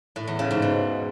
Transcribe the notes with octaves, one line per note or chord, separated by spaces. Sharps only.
A2
E2
C#3
G#2
B2